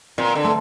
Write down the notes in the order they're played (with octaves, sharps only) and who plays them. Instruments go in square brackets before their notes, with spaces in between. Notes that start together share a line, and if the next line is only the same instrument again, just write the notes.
[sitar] A#2 [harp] C4
[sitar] D3
[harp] A3